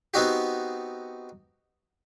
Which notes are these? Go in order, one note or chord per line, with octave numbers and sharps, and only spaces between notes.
B3 C4 D#4 F#4 G4